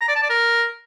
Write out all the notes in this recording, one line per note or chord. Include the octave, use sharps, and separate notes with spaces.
A#5
D5
A5
D5
A#4